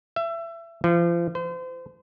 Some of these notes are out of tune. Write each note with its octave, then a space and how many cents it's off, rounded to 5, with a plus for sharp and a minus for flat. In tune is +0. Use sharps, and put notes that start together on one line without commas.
E5 +25
F3 -35
C5 -35